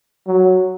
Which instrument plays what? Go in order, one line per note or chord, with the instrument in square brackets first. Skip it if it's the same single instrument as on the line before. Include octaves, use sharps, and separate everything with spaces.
[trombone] F#3